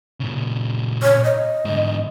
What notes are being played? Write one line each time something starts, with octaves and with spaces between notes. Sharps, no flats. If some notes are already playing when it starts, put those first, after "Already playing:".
A#2 C#3
C#5
D#5
G#2 D3